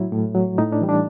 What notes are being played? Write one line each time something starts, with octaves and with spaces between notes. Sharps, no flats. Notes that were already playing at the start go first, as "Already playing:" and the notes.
Already playing: A2 F#3 E4
A2
F#3
A2 D#4
D4
E3 G3
D4